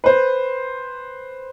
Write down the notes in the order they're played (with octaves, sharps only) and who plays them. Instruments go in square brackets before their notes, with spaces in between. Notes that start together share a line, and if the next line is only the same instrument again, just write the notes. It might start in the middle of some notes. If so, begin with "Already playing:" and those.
[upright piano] B4 C5